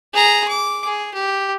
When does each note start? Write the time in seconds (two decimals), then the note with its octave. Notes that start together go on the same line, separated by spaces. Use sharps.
0.14 G#4 A#5
0.48 D6
0.85 G#4
1.14 G4